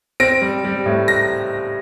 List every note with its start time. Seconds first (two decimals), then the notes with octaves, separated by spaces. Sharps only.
0.20 C4 A#6 D7
0.42 G3
0.65 G3
0.86 A2
1.08 A#6